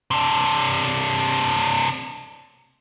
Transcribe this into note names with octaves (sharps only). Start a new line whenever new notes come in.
C3 D4